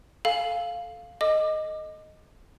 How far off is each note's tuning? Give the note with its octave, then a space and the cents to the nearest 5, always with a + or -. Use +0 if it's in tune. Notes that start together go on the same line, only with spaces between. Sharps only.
A4 -5 F5 +0 G#5 +5
A4 +0 D#5 +0 D6 +25